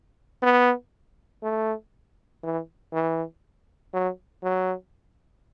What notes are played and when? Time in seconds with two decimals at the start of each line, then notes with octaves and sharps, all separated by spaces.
0.43 B3
1.43 A3
2.43 E3
2.93 E3
3.93 F#3
4.43 F#3